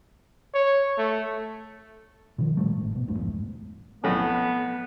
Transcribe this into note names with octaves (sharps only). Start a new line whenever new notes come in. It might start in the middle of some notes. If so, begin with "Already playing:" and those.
C#5
A3
B2 D#3 F3
A#2 G3 A3
G#1 A2
B2
D#1 A#1 G2 A3
B1 E2 G#2
B1 F2 A2 B3 C#4